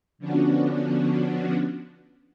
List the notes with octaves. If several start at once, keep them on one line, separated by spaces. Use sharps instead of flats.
D3 F3 B3 C#4 D4 F#4